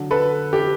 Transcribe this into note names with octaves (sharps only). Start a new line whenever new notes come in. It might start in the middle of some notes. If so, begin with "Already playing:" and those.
Already playing: D3 F#3
A4 B4
G4 A4